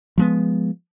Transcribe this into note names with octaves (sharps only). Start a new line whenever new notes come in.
F3 G#3 B3